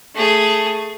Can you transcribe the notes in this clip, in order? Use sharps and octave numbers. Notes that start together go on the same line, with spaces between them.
A3 G#4